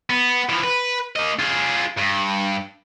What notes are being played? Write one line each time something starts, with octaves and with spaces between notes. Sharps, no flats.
B3
E3 F3
B4
A#3 D#5
F4 G#4
G2